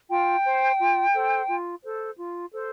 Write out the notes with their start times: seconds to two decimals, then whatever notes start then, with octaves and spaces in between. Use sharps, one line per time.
0.09 F4 G5
0.44 C5
0.79 F4
1.14 A4 C5
1.48 F4
1.83 A4 C5
2.17 F4
2.52 A4 C5